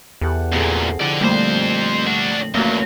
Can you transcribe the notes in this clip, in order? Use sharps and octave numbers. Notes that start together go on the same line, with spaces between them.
E2 G4 A4 F#5
D2 A#2 C4 G#4 A4
F2 D3 E4 D5 F#5
F2 A#2 G3 A3 C5
D4 F#4
E2 F#3 A3 A#3 C#4 F#4